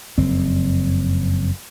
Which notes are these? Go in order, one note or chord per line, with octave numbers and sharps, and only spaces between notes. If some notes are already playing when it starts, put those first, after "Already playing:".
F#1 F2 C4